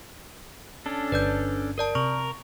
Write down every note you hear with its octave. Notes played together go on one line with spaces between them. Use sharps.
C#4 D4 A4
G1 B4 D5 G6
A#4 D5 A5
C3 A#4 C#6